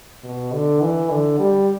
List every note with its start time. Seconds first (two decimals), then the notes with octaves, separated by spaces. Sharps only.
0.24 B2
0.53 D3
0.82 E3
1.10 D3
1.39 G3